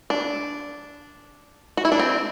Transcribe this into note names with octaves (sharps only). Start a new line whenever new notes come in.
D4
F#4
E4
D4
C4